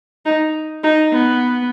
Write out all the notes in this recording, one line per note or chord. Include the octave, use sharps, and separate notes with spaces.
D#4
D#4
B3